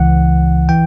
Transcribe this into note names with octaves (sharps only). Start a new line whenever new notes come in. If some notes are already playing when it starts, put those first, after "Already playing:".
Already playing: C#2 C#3 E3 F#5
E3 G5